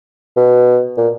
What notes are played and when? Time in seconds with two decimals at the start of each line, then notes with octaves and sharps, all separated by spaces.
0.36 B2
0.97 A#2